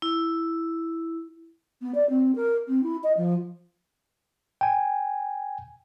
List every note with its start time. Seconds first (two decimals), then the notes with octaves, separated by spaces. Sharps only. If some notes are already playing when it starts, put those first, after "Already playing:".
0.02 E4
1.81 B3
1.95 D5
2.09 C4
2.35 A#4
2.68 C4
2.83 E4
3.03 D#5
3.17 F3
4.61 G5 G#5